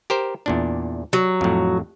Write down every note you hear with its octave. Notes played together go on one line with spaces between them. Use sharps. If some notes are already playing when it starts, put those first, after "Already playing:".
G4 A#4 C5
E2 A#2 D4
F#3
F2 A2